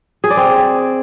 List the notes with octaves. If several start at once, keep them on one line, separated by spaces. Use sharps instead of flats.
G#4
D5
C4